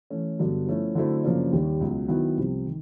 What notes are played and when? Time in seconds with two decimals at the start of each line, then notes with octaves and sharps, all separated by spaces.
0.10 E3 A3 C#4
0.39 G2 D3 F#3 B3
0.67 F3 A3 C#4 E4
0.95 D3 F#3 A3 C4 E4
1.23 F#2 C#3 F3 A#3 D4
1.52 D#2 D#3 G3
1.81 C#2 B2 F#3
2.08 D#3 F#3 B3 E4
2.37 C2 C3 F3
2.66 D#3